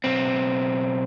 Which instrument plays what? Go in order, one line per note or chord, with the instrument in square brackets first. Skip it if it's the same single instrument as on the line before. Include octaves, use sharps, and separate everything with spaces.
[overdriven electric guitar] B1 C4